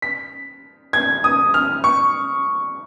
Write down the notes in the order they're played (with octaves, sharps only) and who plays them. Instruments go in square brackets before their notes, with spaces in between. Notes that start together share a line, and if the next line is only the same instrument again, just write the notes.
[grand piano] B6
G#6
D#6
F6
C#6